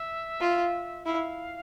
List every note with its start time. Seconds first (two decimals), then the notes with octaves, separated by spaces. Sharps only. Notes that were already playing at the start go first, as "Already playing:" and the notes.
Already playing: E5
0.41 F4
1.06 E4 F5